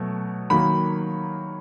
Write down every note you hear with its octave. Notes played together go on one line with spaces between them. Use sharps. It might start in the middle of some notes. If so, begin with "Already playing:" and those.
Already playing: B2 F#3 A3
D#3 F#3 A#3 B5